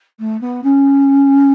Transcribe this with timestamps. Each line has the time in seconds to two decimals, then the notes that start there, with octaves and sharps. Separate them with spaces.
0.20 A3
0.41 B3
0.64 C#4